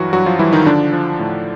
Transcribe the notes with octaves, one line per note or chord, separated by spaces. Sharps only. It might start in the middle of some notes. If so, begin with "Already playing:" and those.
Already playing: G2 E3 F#3 F#4
G2 F#3 F#4
F3 F4
E3 G3 E4
D#3 D#4
D3 F3 D4
F3
A2